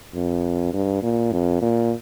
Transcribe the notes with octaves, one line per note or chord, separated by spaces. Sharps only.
F2
G2
A#2
F2
A#2